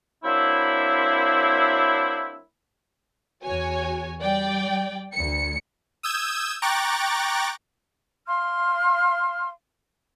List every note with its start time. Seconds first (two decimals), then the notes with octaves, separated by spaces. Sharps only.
0.25 F#3 A#3 C4 D4 E4
3.42 E2 F#4 C#5 G#5
4.21 G3 D5 G5
5.13 D2 C#7
6.03 D#6 E6 G6 G#6 E7
6.62 G5 A#5 C#6 D6 F#6 A6
8.27 F5 C6 F6